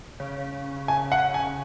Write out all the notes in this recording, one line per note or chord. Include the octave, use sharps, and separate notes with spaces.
C#3
G#5
F#5
G#5